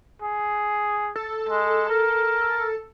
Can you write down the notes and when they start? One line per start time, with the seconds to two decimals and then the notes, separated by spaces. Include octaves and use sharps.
0.22 G#4
1.16 A4
1.49 G#3
1.89 A#4